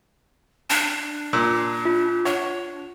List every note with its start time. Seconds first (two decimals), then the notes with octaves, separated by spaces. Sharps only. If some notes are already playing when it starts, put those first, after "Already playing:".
0.70 D4
1.33 A#2 E6
1.85 F4
2.25 D4 C#5 F#5